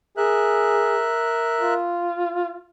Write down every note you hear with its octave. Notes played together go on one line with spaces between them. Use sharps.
G#4 A#4 E5 F#6
F4